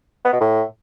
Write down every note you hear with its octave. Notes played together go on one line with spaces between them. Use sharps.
B3
B2
A2